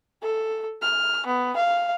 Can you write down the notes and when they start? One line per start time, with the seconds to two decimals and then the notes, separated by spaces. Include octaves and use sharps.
0.22 A4
0.82 F6
1.26 B3
1.56 F5